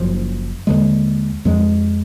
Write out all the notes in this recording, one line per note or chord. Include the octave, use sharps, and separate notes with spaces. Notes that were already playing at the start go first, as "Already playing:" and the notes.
Already playing: F#1 F#2 F3
D#2 D3 G#3
F2 F3 G#3